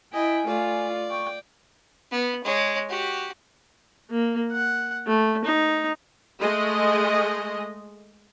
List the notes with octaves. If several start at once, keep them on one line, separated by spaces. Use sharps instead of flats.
E4 D#5 G5 G#5
A3 F4 D5
G5 C#6
B3
G#3 C#5
F#4 G4
A#3
F#5
A3
D#4
G#3 A3 D#5